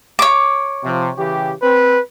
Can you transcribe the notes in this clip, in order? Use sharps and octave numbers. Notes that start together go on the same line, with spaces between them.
C#5 D6
C3 F3
C#3 E3 G4
C4 B4